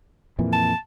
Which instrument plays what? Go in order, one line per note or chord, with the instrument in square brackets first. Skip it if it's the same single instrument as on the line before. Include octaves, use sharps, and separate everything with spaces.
[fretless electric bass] F2 A#2 E3
[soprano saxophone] A5